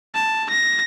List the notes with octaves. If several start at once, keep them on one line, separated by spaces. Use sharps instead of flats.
A5
A#6